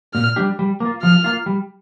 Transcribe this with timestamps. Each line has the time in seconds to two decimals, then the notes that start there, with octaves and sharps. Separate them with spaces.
0.14 A#2 F6
0.36 G3 D4 G4
0.59 G3
0.80 A#3 F4
1.02 F3 F6
1.24 A#3 F4
1.46 G3